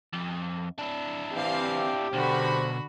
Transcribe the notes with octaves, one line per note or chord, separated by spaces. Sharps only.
F2
D4 E4
E3 C4 G4 F5
B1 D3 F#4 C5 B5